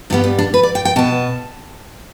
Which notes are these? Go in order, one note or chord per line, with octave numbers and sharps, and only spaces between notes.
G2 G3 B3 D4
B3
D4
B4
D5
G5
G5
B2 B3 A5